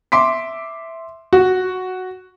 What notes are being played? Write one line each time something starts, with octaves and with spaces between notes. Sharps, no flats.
E5 C6 D6 B6
F#4